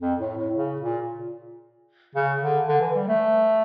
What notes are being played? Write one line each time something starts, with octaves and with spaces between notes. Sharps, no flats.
F2
A2
A2
C#3
A#2
C#3
D3
D3
E3
G3
A3